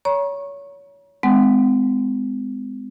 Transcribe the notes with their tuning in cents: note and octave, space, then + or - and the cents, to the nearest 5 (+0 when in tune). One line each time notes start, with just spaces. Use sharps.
C#5 +25 A#5 +35 C#6 -20
G#3 +0 C4 -40 F#5 +25